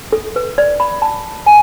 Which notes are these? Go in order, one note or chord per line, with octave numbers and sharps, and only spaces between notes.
A4
B4
D5
B5
A5
G#5